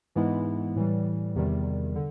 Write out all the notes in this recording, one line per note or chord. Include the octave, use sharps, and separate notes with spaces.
G#2 E3 G#3 B3 E4
A2 E3 G3
E2 C3 D#3 G3
D3